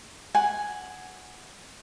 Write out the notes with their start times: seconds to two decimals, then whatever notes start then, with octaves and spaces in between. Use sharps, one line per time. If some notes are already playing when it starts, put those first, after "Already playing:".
0.35 F#5 G#5